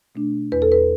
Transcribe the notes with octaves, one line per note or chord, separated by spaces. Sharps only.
B2 A3 D4
E2 B4
A4
B4